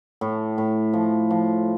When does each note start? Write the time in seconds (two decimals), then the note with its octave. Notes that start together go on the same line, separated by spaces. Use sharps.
0.21 A2
0.58 A2
0.93 F3
1.31 F3